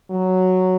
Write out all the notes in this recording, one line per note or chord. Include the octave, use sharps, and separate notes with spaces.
F#3